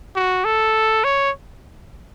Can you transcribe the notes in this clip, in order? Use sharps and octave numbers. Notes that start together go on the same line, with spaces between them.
F#4
A4
C#5